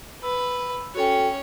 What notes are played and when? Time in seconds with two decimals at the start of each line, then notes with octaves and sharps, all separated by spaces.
0.23 B4 E6
0.95 C#4 F#4 A4 C#5 G5